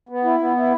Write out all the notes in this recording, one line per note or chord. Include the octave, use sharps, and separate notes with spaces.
B3
E4
B3
E4